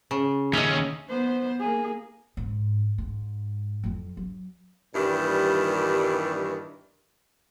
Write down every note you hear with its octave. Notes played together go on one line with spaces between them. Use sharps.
C#3
D#2 C#4 D#5 E5
B3 C5
A#3 G#4
G#2
G#2
F2 F#3
F#3
G2 A#2 D#3 E3 G3